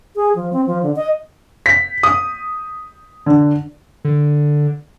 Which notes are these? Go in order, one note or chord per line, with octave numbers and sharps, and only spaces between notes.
G#4
F3
C4
F3
D3
D#5
B6
D#6
D3
D3